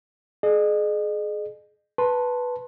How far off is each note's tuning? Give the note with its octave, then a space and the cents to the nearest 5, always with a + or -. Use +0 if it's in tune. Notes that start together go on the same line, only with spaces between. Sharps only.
G#4 +30 D#5 -40
B4 +0 A5 +0 C6 +25